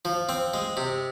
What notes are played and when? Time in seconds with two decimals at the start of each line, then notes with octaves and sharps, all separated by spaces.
0.05 F3
0.29 C4
0.54 G#3
0.77 C3